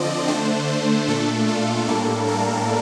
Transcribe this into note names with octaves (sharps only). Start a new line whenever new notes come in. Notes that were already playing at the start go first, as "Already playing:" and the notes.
Already playing: D3 F3 C4 D5 D#5
D3 A3 D4 C5
C5
A#2 A3 D4 A4
F4
A2 G3 A#3 D4 A4
A#4